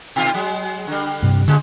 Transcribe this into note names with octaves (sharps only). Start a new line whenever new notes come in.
B2 D#3 F4
F#3 G#3
D3 G3
G2 C3
A2 D3 G#3